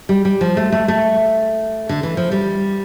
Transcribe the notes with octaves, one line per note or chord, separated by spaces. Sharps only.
G3
G3
F3
A3
A3
A3
D3
E3
F3
G3